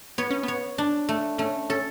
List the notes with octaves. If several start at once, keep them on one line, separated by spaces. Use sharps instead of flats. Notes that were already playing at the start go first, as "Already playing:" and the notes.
B3 C#5
C#4
B3 C#5
D4
A3
A3 C#4
C#4 A4